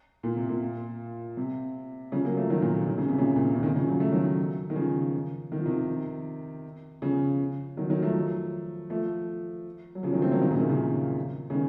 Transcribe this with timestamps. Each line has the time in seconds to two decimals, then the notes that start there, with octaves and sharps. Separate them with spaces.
0.23 A#2
0.36 C3
0.49 A#2
1.37 C3
2.12 C#3 F3
2.25 F#3 A#3
2.37 F3 A3
2.50 D#3 F#3
2.62 A#2
2.87 D#3
2.98 C#3
3.08 C3
3.19 A#2 C#3
3.36 A#2
3.45 C3
3.54 C#3
3.63 C3 D#3
3.75 C#3 F3
3.88 F#3
4.00 A3
4.11 D#3 F#3
4.70 D#3
4.76 C#3 F3
5.52 D#3
5.58 F3
5.66 C3 D#3
7.02 C#3 F3
7.77 D#3 F#3
7.90 D#3 F#3
8.02 F3 A3
8.90 F3 A3
9.95 F#3
10.03 C#3 F3
10.12 D#3 F#3
10.22 A3 C4
10.31 F#3 A#3
10.41 C3 D#3
10.51 A#2 C#3
10.60 C3 D#3
10.69 C#3 F3
11.50 C#3
11.54 D#3